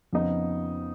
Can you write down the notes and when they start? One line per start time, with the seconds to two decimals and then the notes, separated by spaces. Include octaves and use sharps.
0.13 F2 C#3 F3 B3 D#4